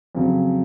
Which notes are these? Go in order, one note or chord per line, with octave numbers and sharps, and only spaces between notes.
F2 C#3 F#3